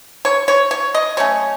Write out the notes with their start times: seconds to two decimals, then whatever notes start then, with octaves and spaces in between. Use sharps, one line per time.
0.25 C#5
0.48 C#5
0.71 C#5
0.95 D#5
1.17 F#3 A3 C#4 C#5